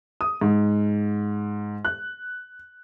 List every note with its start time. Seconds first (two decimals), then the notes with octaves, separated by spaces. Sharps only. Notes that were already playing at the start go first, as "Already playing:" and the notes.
0.21 D#6
0.41 G#2
1.85 F#6